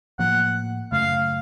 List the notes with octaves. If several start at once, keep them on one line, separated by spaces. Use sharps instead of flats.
A2 F3 A#3 F#5
F#2 C#3 A3 F5